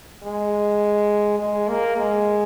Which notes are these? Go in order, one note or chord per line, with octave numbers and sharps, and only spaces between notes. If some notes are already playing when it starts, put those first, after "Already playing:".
G#3
G#3
A#3
G#3